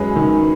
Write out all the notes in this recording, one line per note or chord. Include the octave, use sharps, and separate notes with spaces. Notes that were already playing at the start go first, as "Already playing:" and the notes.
Already playing: F#2 G#3 C#4 B4 C#5
D#3